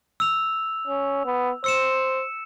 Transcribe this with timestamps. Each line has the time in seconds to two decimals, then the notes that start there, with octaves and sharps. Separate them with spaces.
0.20 E6 F7
0.87 C#4
1.25 B3
1.64 C5 E6 C#7 E7